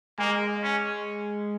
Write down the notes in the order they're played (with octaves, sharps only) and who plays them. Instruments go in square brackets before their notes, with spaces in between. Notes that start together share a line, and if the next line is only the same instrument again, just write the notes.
[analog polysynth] G#3 [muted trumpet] A#3
[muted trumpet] C#4